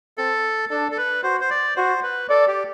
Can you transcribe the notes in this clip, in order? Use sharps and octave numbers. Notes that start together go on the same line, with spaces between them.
C4 A4
D4 A4
A4
B4
F#4 C5
C5
D5
F#4 C5
B4
A4 D5
G4